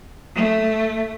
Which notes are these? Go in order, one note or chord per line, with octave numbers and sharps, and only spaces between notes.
A3